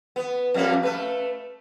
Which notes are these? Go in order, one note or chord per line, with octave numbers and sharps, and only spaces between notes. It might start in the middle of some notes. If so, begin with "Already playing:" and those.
B3
F2 G3 A#3
A3 B4